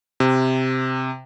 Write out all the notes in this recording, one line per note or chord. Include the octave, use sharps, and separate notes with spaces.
C3